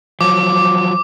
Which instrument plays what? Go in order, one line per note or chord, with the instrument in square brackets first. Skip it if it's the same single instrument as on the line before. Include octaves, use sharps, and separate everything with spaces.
[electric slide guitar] F3 F#3 [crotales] D6